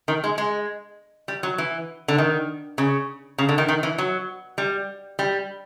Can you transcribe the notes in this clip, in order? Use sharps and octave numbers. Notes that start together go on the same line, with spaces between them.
D#3
G#3
G#3
G3
F#3
E3
D3
D#3
C#3
C#3
D3
D#3
D#3
E3
F#3
G3
G3